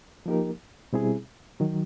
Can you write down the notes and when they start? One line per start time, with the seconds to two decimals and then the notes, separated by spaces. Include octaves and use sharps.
0.26 F3 A#3 D#4 G4 A#4
0.93 B2 G3 C4 E4 G#4
1.60 D#3 F#3